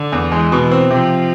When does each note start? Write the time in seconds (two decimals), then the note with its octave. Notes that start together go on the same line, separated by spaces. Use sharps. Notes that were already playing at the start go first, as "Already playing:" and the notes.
Already playing: D3
0.12 E2
0.32 E3 G#3
0.52 B2
0.62 E3
0.71 C4
0.90 C3 F3